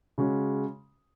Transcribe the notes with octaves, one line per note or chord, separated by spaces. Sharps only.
C#3 G#3 C#4 F#4